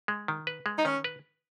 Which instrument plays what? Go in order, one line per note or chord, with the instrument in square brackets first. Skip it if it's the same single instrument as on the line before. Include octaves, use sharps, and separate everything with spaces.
[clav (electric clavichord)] G#3
D#3
B4
G#3
[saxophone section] D#4
[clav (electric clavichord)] D#3 [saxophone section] C#4
[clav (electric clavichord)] B4